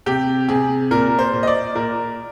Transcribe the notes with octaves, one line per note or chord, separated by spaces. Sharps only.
C3 G4
C3 G#4
A#2 A#4
C5
A#2
D#5
D5
A#2 A#4